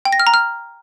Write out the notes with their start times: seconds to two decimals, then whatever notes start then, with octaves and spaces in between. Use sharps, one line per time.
0.05 G5
0.12 A#6
0.20 F6
0.27 A#5
0.34 F6